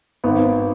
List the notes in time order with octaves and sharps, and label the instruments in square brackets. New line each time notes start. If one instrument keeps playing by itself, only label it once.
[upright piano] G#1 B3